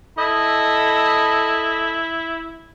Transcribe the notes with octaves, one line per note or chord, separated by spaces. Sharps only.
E4 A4 D#5 B5